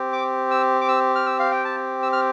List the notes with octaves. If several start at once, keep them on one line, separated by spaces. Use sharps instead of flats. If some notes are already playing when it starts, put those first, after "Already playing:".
Already playing: C4 G4
D6
E6
D6
E6
F6
E6
F5
G5
A5
E6
F6